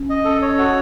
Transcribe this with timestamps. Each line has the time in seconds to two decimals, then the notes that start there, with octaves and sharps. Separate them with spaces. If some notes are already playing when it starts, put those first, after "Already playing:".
Already playing: C#4
0.10 D#5
0.25 A4
0.42 C#5
0.58 F#4